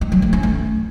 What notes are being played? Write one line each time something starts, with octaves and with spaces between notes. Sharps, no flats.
G#3
F#3
A3
C#4
A3